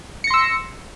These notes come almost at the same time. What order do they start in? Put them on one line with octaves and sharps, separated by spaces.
C#7 A#6 C6 E6